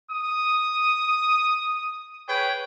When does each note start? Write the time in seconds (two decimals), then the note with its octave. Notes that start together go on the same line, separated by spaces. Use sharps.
0.11 D#6
2.28 G#4 B4 C#5 G5